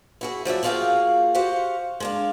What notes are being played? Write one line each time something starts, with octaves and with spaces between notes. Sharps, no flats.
E4 F#4 G#4
F3 F#3 D5 E5
A#3 F4 F#4 G#4 F5 G5
F#4 G4 C5 F5 F#5
G#3 D4 F5